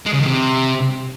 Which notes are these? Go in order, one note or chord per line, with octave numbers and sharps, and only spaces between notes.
G#3
C#3
D#3
C3